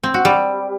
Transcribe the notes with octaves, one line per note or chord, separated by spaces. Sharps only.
C4
F#4
G3